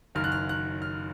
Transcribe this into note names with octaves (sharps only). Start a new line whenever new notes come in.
F#1 F#2 D#3 F6
F#6
F6
F#6
F6